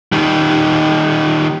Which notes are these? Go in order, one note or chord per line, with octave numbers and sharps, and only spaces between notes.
D#3 G3